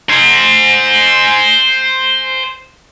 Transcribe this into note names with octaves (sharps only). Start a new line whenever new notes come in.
C5 G#5